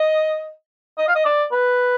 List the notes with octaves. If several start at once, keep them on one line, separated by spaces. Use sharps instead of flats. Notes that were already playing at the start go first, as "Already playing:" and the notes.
Already playing: D#5
D#5
F5
D#5
D5
B4